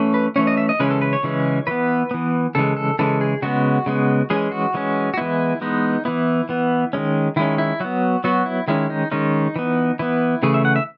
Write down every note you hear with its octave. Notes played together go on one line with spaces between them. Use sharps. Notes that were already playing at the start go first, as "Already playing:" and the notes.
Already playing: E3 A3 C#4
B4
E3 A3 C#4 C#5
D#5
E5
D#5
C#3 E3 G#3 C#4 B4
A4
B4
C#5
C#3 E3 G#3 C#4
E3 B3 B4
E3 B3
C#3 E3 G#3 A4
A4
C#3 E3 G#3 A4
G#4
C#3 G#3 B3 F#4
C#3 G#3 B3
E3 G#3 C#4 G#4
F#4
E3 G#3 C#4
F#4
E3 G#3 B3 E4
E3 G#3 B3 D#4
E3 B3 E4
E3 B3
D#3 G#3 C#4
D#3 G#3 C#4 E4
E4
F#3 B3 F#4
F#3 B3 F#4
E4
D#3 G#3 C#4 E4
D#4
D#3 G#3 C#4 D#4
E3 B3
E3 B3 E4
C#3 E3 A3 G#4
E5
F#5
E5